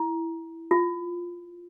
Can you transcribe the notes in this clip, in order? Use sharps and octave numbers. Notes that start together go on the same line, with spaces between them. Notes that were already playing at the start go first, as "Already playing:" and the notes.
Already playing: E4
F4